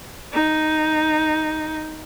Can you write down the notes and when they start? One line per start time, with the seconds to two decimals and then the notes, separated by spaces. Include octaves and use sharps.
0.33 D#4